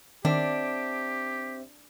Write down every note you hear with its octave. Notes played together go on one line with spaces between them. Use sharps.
D#3 C4 D4 G4 C5 E5